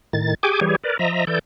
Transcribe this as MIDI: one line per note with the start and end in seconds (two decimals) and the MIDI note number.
0.13 0.34 45
0.13 0.34 51
0.13 0.34 93
0.43 0.60 67
0.43 0.60 68
0.43 0.60 79
0.43 0.60 80
0.43 0.60 86
0.61 0.76 52
0.61 0.76 55
0.61 0.76 67
0.61 0.76 68
0.61 0.76 73
0.84 0.97 70
0.84 0.97 71
0.84 0.97 74
0.99 1.25 53
0.99 1.25 75
0.99 1.25 76
0.99 1.25 82
1.27 1.39 52
1.27 1.39 69
1.27 1.39 74
1.27 1.39 91